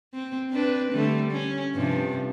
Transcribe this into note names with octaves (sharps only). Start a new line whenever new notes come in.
C4
C4 D4 B4
D3 G3 A3
C#4
G2 C3 F3